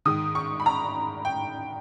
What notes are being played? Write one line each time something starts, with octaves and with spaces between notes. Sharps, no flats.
G#2 D#3 D#6
C#6
B5
A#5
G5